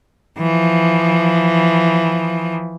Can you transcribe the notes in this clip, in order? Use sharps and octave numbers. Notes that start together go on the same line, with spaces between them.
E3 F3